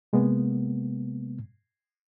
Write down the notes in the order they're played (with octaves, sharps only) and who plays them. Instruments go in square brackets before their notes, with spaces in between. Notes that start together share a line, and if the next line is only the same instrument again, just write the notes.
[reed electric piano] C3 G#3 A#3 B3